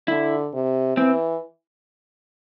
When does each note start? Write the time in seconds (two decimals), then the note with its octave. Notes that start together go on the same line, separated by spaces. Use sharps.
0.08 D3 E4
0.54 C3
0.97 E3 C4